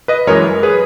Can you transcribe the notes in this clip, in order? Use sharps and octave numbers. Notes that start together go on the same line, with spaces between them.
B4 D#5
F#2 E3 G#3 A#4 C#5
G#4 B4